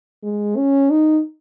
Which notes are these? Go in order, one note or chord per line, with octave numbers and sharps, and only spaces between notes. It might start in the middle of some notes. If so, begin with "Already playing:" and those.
G#3
C#4
D#4